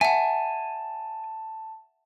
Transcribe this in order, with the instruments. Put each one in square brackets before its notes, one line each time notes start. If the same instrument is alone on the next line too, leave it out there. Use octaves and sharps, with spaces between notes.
[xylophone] E5 F#5 [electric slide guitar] G#5 [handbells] A5